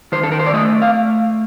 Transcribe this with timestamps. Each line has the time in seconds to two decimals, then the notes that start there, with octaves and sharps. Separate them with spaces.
0.12 D#3 C5
0.24 A4
0.32 A#4
0.39 C5
0.46 D5
0.54 A3 D#5
0.82 F5